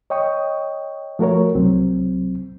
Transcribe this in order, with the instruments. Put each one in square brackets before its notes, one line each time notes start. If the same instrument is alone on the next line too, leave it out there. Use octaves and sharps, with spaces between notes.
[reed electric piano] C#5 D#5 G5 C#6 D#6
F3 A3 F#4 A#4 C#5
C2 F#3 C4